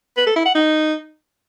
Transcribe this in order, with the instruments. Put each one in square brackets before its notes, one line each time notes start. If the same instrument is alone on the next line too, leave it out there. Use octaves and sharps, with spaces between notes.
[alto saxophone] B4
A4
E4
F#5
D#4